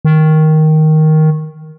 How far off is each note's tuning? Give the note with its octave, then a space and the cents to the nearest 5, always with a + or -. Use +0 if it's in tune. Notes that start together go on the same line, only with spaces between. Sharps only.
D#3 +5